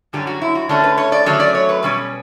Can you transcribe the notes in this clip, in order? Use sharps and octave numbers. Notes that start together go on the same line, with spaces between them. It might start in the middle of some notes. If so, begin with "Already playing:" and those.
F#2 D3 G3 C#4 G4
F#4
E4
F#4
D3 A3 C#4 D4
B4
C#5
D5
D3 F#3 A3 C#4 C#5
D5
C#5
B4
B2 G3 C#4